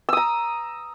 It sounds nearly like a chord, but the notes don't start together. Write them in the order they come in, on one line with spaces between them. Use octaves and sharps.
E6 D#6 A#5